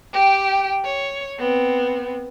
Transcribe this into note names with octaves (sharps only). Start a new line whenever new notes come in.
G4 G5
C#5
B3 C4